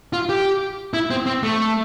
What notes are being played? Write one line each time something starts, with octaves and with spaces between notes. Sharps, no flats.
F4
G4
E4
C4
C4
A3